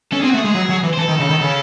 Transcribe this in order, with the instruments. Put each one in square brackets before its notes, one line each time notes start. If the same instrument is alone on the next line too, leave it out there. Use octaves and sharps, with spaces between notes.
[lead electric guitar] C#4 [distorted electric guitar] A4
[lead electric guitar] C4 [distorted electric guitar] G#4
[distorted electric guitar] F#4
[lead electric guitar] A3
[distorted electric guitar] G#4
[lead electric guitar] G#3
F#3
F#3
E3
[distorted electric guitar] C5
[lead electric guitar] E3 [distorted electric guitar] A4
[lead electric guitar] D#3
C#3
D#3
C#3